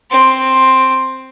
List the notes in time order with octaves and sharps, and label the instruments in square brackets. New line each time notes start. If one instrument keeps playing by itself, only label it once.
[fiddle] C4 C6